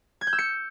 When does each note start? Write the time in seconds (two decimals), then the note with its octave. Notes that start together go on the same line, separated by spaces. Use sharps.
0.21 G#6
0.27 G6
0.33 E6
0.39 C#7